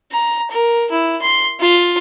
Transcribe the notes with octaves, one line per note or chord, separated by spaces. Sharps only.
A#5
A#4
E4
C6
F4